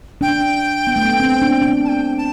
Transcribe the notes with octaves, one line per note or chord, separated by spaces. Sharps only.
D4 G5
B3
A3
B3
C4
D4
D4
A5
G5
A5